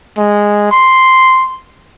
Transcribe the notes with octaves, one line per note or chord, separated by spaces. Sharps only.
G#3
C6